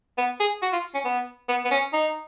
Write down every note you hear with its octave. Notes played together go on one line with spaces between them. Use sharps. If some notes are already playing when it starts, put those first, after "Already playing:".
B3
G#4
F#4
F4
C#4
B3
B3
B3
C#4
D#4